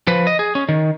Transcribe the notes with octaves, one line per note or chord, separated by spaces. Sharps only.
F3 B4
D#5
G#4
C#4
D#3